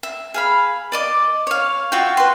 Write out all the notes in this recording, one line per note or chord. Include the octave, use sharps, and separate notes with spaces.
E5
G#4 F5 B5
D5 D#5 D6
C#5 F5
F4 F#4 E5 G5
B4 C6